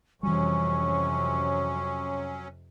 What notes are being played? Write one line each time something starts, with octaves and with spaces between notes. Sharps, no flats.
F2 C3 E3 F#3 G3 C#4 C#6